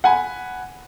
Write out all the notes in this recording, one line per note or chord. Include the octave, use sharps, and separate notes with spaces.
F#5 G#5 B5